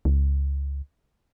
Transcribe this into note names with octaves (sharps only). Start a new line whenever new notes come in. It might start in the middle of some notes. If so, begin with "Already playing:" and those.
C#2